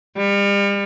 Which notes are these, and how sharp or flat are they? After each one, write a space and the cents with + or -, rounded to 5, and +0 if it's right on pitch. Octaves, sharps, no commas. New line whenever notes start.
G3 +40